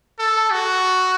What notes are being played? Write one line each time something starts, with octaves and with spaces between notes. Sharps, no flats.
A4
F#4